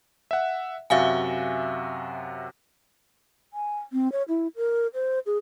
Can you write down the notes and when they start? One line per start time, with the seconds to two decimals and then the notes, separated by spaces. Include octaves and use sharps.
0.31 E5 F#5
0.90 F#2 C3 F#4 E5 F5 G#5
3.53 G#5
3.93 C4
4.12 C#5
4.28 E4
4.56 A#4
4.94 C5
5.26 G#4